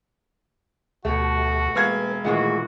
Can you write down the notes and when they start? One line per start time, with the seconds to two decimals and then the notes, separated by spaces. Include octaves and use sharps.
1.05 D2 B2 A3 F#4 G4
1.75 E1 A#3 B4 F5 G#6
2.25 A#2 D#3 E3 A3 F#4 G#4 E5